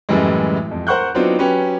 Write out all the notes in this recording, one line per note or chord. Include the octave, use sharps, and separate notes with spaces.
F#2 A2 E3 G3 G#3
F2
A#4 C5 F#5 C#6 F#6 G6
F#3 B3 C4 D4 D#4 F4
F#3 C#4 G4 B4